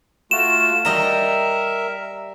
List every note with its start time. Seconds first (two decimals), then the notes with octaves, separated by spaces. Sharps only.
0.31 A3 F4 F#4 E7
0.85 G3 A#4 D#5 E5 A#5